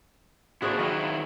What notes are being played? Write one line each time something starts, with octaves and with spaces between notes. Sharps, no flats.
A#3 D4 E4 F#4 G#4 C5
D#3 F#3 E4 D#5 F5